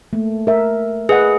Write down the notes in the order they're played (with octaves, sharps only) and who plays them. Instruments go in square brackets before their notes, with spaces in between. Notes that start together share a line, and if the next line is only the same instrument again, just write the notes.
[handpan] A3 A#3
A#4 E5
[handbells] G#4 [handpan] B4 D#5 F#5